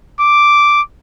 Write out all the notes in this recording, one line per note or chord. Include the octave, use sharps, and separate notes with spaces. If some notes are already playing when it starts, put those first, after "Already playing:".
D6